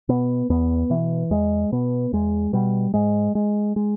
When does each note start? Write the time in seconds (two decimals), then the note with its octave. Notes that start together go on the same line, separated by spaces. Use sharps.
0.09 B2 B3
0.50 E2 B3
0.90 B2 E3
1.31 E2 G#3
1.72 B2 B3
2.13 E2 G#3
2.53 B2 G3
2.94 G#2 G#3
3.35 G#3
3.76 G#3